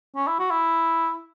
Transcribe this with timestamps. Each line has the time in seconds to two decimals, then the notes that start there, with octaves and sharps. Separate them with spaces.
0.16 C#4
0.27 E4
0.39 F#4
0.51 E4